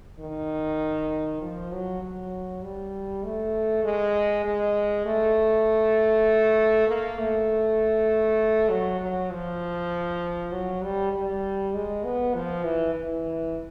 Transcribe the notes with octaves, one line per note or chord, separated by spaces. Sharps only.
D#3
F3
F#3
F#3
G3
A3
G#3
G#3
A3
A#3
A3
F#3
F#3
F3
F#3
G3
G3
G#3
B3
F3
E3
E3